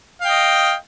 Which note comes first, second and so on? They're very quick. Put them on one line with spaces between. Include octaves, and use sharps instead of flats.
F5 G5 D#5